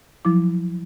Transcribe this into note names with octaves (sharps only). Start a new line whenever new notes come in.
F3 F#3 E4 D6